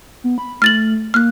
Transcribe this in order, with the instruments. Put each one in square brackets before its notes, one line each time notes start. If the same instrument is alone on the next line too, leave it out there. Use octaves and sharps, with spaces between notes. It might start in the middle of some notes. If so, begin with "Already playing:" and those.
[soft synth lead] B3
B5
[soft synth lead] A3 [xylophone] F6 A6 F#7
[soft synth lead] A#3 [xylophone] F6 F#6